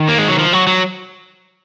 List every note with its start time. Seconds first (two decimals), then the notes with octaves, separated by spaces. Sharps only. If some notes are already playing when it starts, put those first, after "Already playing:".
Already playing: D#3
0.09 A#3
0.18 G#3
0.28 F#3
0.38 F3
0.53 F#3
0.67 F#3